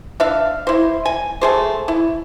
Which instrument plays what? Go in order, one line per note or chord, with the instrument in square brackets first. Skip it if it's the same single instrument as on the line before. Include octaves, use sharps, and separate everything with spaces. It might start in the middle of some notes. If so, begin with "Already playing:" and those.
[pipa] D4 E5 F5
E4 C5
G#5
A3 G#4 C5
E4